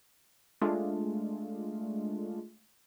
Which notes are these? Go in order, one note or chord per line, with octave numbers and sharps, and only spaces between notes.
G#3 A3 D4 F4